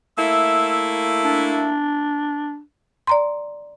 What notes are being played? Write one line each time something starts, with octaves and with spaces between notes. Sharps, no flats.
A3 A#3 E4 E6
D4
D5 A#5 C6